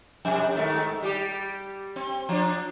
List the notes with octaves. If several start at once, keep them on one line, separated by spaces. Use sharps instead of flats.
F2 C3
G#2 D#3 A3
G3 G4
C4
F3 D4